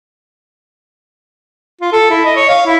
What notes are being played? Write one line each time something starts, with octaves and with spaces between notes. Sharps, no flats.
F4
A4
E4
D#5
C#5
F5
E4